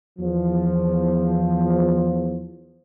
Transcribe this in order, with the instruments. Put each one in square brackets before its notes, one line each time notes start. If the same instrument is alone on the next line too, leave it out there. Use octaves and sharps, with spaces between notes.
[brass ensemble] E2 F3